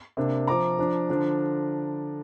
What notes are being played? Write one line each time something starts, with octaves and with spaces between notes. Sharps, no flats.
C3 A#3 D4
F3 C4 A#5 D6
F3 D4
D3 F3 D4